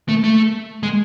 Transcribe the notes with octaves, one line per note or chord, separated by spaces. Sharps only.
A3
A3
G#3